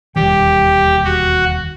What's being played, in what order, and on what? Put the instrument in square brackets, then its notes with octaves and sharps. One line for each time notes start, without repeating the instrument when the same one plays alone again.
[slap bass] E1 D#2 D#3 G3 [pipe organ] G4
[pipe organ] F#4